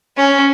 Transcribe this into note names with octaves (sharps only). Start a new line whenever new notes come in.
C#4